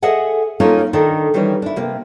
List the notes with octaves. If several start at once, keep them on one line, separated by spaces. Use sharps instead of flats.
G#4 A4 D#5 E5 F#5 G#5
A#3 C#4 D#4 F4 A4
D#3 D4 A4 A#4
D#3 E3 G3 C#4 D#4
D4 E4
C3 A#3